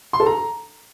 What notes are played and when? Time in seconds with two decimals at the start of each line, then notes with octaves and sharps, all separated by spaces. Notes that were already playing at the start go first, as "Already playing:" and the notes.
0.13 C6
0.20 A4
0.26 A#5